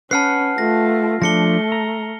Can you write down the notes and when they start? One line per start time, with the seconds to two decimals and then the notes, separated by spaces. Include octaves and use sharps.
0.11 C#4 B4 F#5 A5 B5 F6 C7
0.58 A3 F4 A#6
1.22 F3 A3 D4 A#6 C#7 G7
1.72 A#5